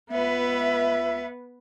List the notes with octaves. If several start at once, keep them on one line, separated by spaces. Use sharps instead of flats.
C#2 B3 B4 E5